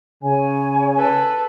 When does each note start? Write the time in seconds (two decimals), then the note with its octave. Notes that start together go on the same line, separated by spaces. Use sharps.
0.24 C#3 C#5 G#5
0.98 A4 B4